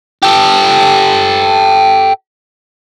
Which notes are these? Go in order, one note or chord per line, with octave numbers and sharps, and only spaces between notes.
G4 A4